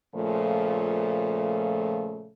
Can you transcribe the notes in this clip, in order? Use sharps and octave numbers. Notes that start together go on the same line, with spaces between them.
A#2 C#3 F3 A3